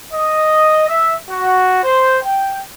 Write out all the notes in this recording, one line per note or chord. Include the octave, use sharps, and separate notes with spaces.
D#5
E5
F#4
C5
G5